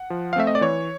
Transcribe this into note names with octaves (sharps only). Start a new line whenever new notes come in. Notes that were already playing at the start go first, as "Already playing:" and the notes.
Already playing: F#5
F3
F5
A3 C4 E5
D#5
D5
E3 C#5